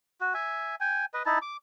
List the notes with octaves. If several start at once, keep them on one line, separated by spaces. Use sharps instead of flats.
F#4
E5 G#5
G5 G#5
B4 D#5
D#4 E4 A5
D6